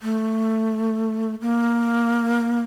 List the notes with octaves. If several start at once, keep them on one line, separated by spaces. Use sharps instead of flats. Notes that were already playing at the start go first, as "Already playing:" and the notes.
A3
A#3